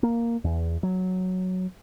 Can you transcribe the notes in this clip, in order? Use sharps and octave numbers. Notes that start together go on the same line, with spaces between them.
A#3
E2
F#3